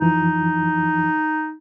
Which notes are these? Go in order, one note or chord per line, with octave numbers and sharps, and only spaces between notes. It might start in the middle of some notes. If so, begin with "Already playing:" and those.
F2 E3 F3 D#4